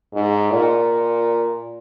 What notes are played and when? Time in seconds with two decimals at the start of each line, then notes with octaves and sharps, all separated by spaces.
0.14 G#2
0.51 A#2